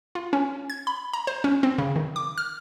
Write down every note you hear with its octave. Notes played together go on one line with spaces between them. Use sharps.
F4
C#4
G#6
B5
A#5
C5
C#4
C4
C#3
D#3
D6
F6